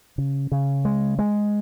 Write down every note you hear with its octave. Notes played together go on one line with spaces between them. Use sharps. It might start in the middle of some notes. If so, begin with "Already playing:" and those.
C#3
C#3
G#3
G#3